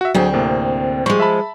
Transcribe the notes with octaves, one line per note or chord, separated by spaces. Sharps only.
F#4 E5
D2 F#3 C4 G#4
A2 C3 A#3
F3 G3 G#3 C5 C#6
E5 A5 B5